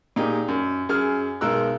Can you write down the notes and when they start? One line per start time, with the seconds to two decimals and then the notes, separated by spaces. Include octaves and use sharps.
0.16 A#2 D#4 G4 G#4
0.48 F#2
0.89 F#2 G#4 F6
1.41 B1 G#3 D#4 A#4 E6 F#6